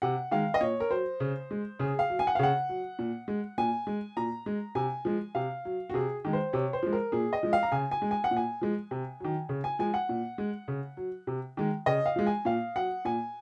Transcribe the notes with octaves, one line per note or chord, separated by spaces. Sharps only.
C3 F#5
D#3 G#3 F5
D#5
A#2 C#5
A#4
F#3 C5
C#3
G#3
C#3 G#4
F5
F#3
G#5
F#5
F5
C#3 F#5
F#3
A#2
G#3
A#2 G#5
G#3
A#2 A#5
G#3
C3 G#5
F3 G#3
C3 F5
F#3
F#4
C3 G#4
D#3 G#3
C5
C3 C#5
C5
F3 G#3
A#4
A#2 G#4
D#5
F3 G#3
F5
A#5
C#3 G#5
G#5
G#3
G#5
F#5
A#2
G#5
F3 G#3
C3
D#3 F#3
C#3
G#5
F3 G#3 G#5
F#5
A#2
G#3
C#3
F#3
C3
D#3 G#3
C#3 D#5
F5
F3 G#3
G#5
A#2 F5
F#3 F#5
A#2 G#5